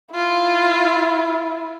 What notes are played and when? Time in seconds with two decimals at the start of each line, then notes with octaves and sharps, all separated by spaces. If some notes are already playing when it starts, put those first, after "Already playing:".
0.15 E4 F4